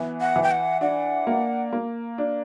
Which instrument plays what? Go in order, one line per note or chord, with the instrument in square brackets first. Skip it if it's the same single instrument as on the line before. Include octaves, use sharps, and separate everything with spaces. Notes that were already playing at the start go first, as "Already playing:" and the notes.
Already playing: [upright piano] E3 B3
[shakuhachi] F#5
[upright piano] E3
[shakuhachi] G5
F#5
[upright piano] D4 [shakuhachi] F#5
[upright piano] A#3
A#3
D4